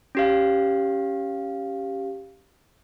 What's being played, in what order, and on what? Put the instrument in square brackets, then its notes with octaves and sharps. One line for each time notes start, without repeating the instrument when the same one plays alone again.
[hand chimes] C#4 G4 F5